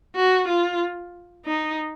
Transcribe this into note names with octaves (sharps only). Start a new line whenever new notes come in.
F#4
F4
D#4